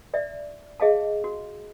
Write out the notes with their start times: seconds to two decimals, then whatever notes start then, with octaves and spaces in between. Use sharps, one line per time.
0.14 D5 E5
0.80 G#4 D#5 F5 A5
1.24 F#4